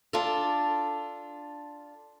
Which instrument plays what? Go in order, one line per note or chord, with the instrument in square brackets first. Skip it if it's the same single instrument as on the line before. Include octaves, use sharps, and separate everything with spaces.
[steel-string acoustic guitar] D4 F4 A4